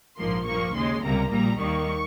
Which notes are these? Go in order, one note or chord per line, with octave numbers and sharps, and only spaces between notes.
A#1 G#2 F3 A#3 C6
G2 F3 A#3 C#6
D#2 C#3 G#3 C6
C#2 C3 G3 A#3 A#5
A#1 A#2 G3 A#5
D#2 D#3 G3 A#3 C#6